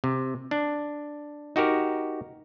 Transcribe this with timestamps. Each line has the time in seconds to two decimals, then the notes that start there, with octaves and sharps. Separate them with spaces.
0.04 C3
0.51 D4
1.56 D#4 F#4 G4 A#4